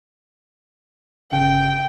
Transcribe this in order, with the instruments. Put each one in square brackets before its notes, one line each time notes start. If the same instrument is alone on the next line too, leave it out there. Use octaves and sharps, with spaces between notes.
[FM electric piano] G1 C#3 [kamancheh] G5